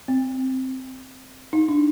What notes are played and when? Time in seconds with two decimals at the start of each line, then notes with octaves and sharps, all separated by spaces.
0.08 C4
1.53 D#4
1.68 D4